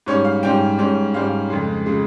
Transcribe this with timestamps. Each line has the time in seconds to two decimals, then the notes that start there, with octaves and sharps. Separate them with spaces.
0.06 G#2 G3 C#4 C#5
0.25 F5
0.43 G#2 G3 C#4 G5
0.78 G#2 G3 C#4
1.14 G#2 G3 C#4 F5
1.50 F2 C#3 G#3
1.86 C#3 G#3